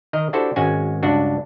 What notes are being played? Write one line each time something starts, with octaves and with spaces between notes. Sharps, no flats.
D#3 A#4 D#5
D4 E4 F#4 G4 A4 C5
G#1 G#3 C#4 F#4 G#5
C#2 G2 D4 F#4